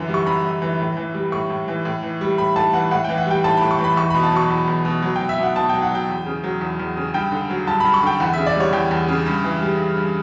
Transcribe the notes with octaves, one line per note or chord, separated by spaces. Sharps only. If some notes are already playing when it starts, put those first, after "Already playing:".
Already playing: F#2 D3 E3
G3
C#6
F#2 B5
F#2
E3
A2
E3
G3
A2 C#6
A2
E3
A2
E3
G3
A2 B5
A2 A5
E3 F#5
A2 F#5
E3 G5
F#5
G3 G5
A2 A5
A2 B5
C#6
E3
B5
E2 C#6
B2 B5
A5
F#3 C#6
E2
E2
B2
F#3
F#3 G5
E5
B2 F#5
B2 A5
F#3 G5
F#5
F#3 G5
E2
C#3
F#3
E2
E2
C#3
G2 G5
D3
F#3
G2 A5
G2 B5
C#6
D3 G5
E2 F#5
C#3 E5
D5
G3 C#5
E2 G5
E2
C#3
G2
E3
G3
G2
G2